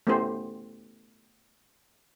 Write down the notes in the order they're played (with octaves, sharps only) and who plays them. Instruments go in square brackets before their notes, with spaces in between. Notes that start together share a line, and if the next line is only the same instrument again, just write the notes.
[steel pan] A3 B3 C#4 E4 G4 C5